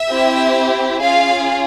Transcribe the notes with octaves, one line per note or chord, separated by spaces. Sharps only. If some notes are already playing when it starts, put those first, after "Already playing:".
Already playing: E5
C4 E4 G4
C#4 F4 G#4 F5